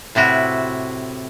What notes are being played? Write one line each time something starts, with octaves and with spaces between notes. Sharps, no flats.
A2 C3 E4 F#4